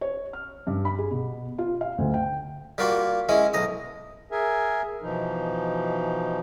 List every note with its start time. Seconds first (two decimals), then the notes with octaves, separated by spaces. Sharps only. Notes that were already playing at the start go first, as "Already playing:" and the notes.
0.01 C#5
0.33 F6
0.67 G2
0.85 B5
0.98 G#4
1.11 B2
1.58 F4
1.81 F5
1.98 D2
2.14 G5
2.78 G3 A#3 F4 F#4 C6
3.29 G#3 C#4 E4
3.54 B1 A#5 D#6
4.31 G#4 A#4 E5 G#5
5.02 B2 E3 F3 D#4